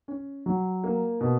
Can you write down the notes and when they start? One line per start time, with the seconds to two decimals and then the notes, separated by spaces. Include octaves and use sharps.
0.08 C#4
0.46 F#3
0.84 A#3
1.21 B2